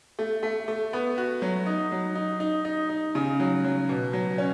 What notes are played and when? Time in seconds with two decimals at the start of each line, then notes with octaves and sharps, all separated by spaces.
0.19 A3
0.43 A3
0.68 A3
0.93 B3
1.18 F#4
1.42 F#3
1.66 D#4
1.92 F#3
2.15 D#4
2.40 D#4
2.65 D#4
2.89 D#4
3.15 C#3
3.40 F#3
3.64 F#3
3.89 B2
4.13 F#3
4.38 C#4